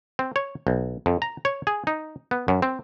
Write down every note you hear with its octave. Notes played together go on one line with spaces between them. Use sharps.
C4
C#5
B1
F2
A#5
C#5
G#4
D#4
B3
F#2
C4